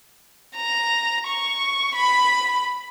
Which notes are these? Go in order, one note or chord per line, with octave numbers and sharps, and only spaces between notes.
A#5
C#6
B5